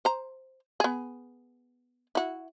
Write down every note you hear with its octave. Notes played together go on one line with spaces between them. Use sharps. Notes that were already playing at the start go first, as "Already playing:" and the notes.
C5 A#5
B3 G#4
E4 F#4